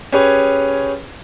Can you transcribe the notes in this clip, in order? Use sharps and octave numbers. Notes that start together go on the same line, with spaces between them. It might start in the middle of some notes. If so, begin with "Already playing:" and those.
C#4 G4 G#4 B4 C#5